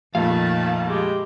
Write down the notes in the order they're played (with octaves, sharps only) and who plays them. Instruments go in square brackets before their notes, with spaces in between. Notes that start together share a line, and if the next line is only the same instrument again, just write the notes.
[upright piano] F2 [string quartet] A#2 D#3 A3 [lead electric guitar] F5 [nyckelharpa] A5
[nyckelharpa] G#3 G4